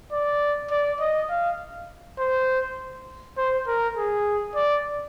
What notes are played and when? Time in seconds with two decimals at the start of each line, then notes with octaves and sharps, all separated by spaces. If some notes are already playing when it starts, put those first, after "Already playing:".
0.12 D5
0.71 D5
1.01 D#5
1.30 F5
2.19 C5
3.38 C5
3.67 A#4
3.97 G#4
4.56 D5